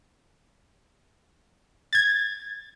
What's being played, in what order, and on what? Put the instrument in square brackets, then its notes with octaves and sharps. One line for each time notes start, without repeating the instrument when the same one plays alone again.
[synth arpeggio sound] G#6 A6